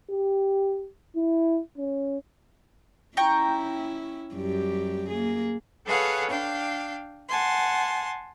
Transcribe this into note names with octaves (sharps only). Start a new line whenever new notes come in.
G4
E4
C#4
C#4 E4 G5 A#5 C#6
F#2 G3 G4
A#3 G#4
G#4 A4 B4 C#5 F5 F#5
D4 F5 G5
F#5 G#5 A5 C6